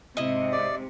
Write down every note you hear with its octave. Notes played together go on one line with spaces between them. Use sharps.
G#2 C3 E4 D#5
D5